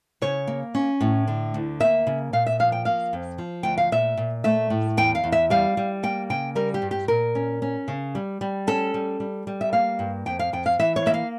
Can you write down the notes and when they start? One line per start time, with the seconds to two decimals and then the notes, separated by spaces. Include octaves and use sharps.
0.22 C#3 C#5
0.47 A#3
0.75 C#4
1.01 A2
1.28 D3
1.54 D2
1.80 A#3 E5
2.07 C#3
2.33 A#2 F5
2.46 E5
2.59 F3 F5
2.72 G5
2.85 A#3 F5
3.13 F2
3.38 F3
3.63 D2 G5
3.78 F5
3.92 A#2 E5
4.17 A#2
4.44 A3 E5
4.70 A2
4.97 E2 G5
5.15 F5
5.24 E2
5.32 E5
5.50 G3 F5
5.77 G3
6.03 A#3 G5
6.30 C#3 G5
6.55 G3 A#4
6.74 G4
6.82 G2
6.91 G4
7.08 A#2 A#4
7.35 C#4
7.62 C#4
7.88 C#3
8.15 G3
8.41 G3
8.67 C#4 A4
8.94 G3
9.20 G3
9.47 G3
9.61 E5
9.73 A#3 F5
9.99 G2
10.26 F2 G5
10.39 F5
10.53 F2 G5
10.66 F5
10.79 E3 E5
10.96 C#5
11.06 A#3 E5
11.14 F5